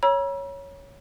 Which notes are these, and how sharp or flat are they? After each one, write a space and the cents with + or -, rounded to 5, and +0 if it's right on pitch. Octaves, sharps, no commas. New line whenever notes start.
C#5 +0 A#5 +45 E6 +20